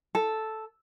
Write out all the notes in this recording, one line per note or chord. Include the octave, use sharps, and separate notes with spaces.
A4